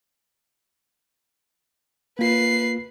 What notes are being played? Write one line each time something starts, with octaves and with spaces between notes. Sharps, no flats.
A#3 F4 B4 C7